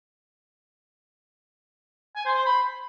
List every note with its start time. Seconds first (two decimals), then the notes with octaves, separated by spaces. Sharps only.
2.15 G#5
2.25 C5
2.35 C5
2.45 B5